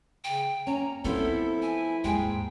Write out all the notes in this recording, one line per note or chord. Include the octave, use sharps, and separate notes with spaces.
C#3 G5
A#3 C#4 A#5
F3 A3 B3 C4 E4 A4
G#5
D#2 G#2 G#3 G5